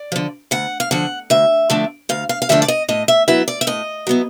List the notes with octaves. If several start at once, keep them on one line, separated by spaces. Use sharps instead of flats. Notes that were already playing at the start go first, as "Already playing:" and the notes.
Already playing: D5
D3 F3
D2 F#5
F5
D3 F3 F#5
D2 E5
D3 F3 A3 D4
D2 F5
F5
F5
D3 F3 A3 D4 E5
D5
D#5
A2 D#5
E5
F#3 B3 E4 E5
D5
E5
A2 D#5
F#3 B3 E4